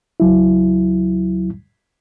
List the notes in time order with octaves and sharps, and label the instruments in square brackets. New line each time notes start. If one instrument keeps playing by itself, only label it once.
[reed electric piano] C#2 F#3 E4